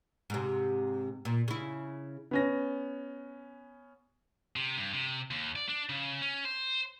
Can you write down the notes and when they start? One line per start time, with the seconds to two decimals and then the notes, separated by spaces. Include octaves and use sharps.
0.30 G#2 C3
1.25 A#2
1.48 C#3 E4
2.31 B3 C#4 A#6
4.56 C3
4.78 G2
4.93 C3
5.31 D#2
5.56 D5
5.69 D4
5.89 C#3
6.21 C#4
6.45 C5